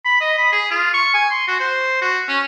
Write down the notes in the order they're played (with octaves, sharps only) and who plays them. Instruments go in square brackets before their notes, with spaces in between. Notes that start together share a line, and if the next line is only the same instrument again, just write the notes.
[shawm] B5
D#5
B5
G#4
F4
C#6
G#5
C6
F#4
C5
F#4
C#4